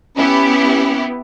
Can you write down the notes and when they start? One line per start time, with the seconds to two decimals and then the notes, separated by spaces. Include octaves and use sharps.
0.17 B3 C#4 E4 G4